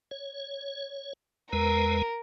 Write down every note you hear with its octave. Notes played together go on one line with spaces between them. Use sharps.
C#5
E2 G#3 A#4 B4